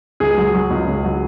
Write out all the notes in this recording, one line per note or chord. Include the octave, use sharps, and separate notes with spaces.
C#2 G#4
F#3
F#3
C#2
C#2
F#3